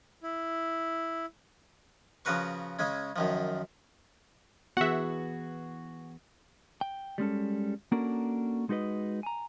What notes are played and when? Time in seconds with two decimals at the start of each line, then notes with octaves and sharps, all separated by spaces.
0.23 E4
2.25 C#3 F3 F#4 A#4 B4 C#6
2.79 C#3 G#3 C#4
3.16 F#2 D#3 F3
4.77 E3 B3 F#4 G#4 E5 F#5
6.81 G5
7.18 G3 G#3 C#4 A4
7.92 A#3 C#4 D4 F#4 A4 A#4
8.69 G#3 D#4 F#4 B4 D#5
9.23 G#5 A#5